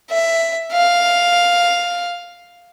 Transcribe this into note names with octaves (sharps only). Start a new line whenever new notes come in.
E5
F5